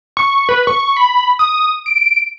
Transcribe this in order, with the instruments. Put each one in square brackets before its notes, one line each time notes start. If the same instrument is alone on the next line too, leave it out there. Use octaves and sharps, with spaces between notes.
[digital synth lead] C#6
B4
C#6
B5
D#6
D7